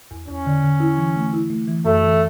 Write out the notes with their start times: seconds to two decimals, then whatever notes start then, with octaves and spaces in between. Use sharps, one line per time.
0.11 E2
0.28 E2 C#4
0.46 D3
0.63 D3
0.80 E4
0.97 E3
1.16 A3
1.33 E4
1.50 A3
1.68 E3
1.85 F#2 A3
2.03 E3